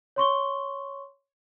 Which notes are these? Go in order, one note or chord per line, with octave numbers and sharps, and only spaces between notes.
C#5 C6 C#6 G7